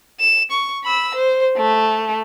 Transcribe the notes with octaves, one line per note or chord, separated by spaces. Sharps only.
E7
C#6
B5 E6
C5
A3